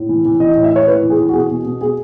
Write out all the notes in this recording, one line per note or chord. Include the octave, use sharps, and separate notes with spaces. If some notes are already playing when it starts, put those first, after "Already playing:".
Already playing: A2
E3
E3
E3 D#5
A2 D#5
E5
A2 C#5
A2 B4
E3
G#4
E3
F#4
B2 G#4
B2
B2
B2 G#4